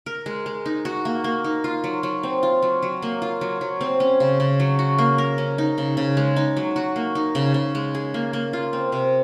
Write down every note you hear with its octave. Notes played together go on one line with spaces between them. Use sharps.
A#4
G#3
G#3
D#4
F#4
A#3
A#3
D#4
F4
F#3
F#3
C4
F4
F#3
F#3
A#3
F4
F#3
F#3
C4
C#4
C#3
C#3
F#3
F#4
A#3
A#4
C#4
D#4
C#3
C#3
G#3
D#4
F#3
F#4
A#3
D#4
C#3
C#3
G#3
G#4
A#3
A#3
F4
C4
C3